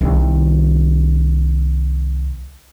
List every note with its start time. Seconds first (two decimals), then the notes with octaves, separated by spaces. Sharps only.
0.01 C2 D#3